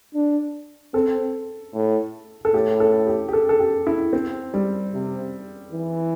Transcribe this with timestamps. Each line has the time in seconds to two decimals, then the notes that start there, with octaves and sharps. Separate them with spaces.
0.14 D4
0.94 C4 A4
1.74 A2
2.45 A4
2.53 A2 G4
2.80 A4
3.07 G4
3.29 G4
3.33 A4
3.49 A4
3.60 G4
3.87 E4
4.13 C4
4.54 G3
4.93 C3
5.72 E3